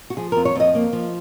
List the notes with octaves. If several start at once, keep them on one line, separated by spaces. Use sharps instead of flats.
F#4
F3 G#4
F2 A#4
C#5
F2 D#5
A#3
F3